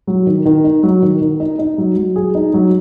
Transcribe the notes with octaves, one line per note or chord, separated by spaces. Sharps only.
F#3
D#3
D#3
D#4
F#3
D#3
D#3
D#4
D#4
F#3
F#3
G#4
D#4
F#3